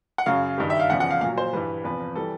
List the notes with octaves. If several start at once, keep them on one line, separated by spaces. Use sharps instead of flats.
F#5
F#2 C#3 F#3 F5
G2 D#3 G3
E5
F5
E2 C#3 F3 F#5
F#5
F5
A#2 F5
F#3
C5
G2 E3 G3 B4
E2 C3 F3 B4
E3 G3 A4